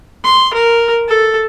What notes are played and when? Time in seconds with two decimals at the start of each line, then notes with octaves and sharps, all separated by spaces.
0.24 C6
0.54 A#4
1.09 A4